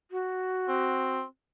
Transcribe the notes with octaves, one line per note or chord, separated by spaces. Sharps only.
F#4
C4